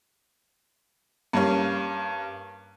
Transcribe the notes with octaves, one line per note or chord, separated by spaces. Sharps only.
G2 A#3 C#4